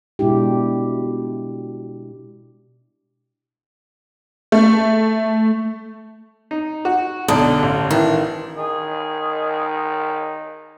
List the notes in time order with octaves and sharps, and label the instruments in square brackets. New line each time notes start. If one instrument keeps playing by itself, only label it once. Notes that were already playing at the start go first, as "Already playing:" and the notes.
[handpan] B2 G#3 D4 E4 G4
[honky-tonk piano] A3
[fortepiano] D#4
F#4
[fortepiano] B1 D4 [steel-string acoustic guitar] D3 [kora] D#4
[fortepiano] A1
[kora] D#3 E3 [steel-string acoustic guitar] D4
[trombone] D#3 [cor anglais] G#4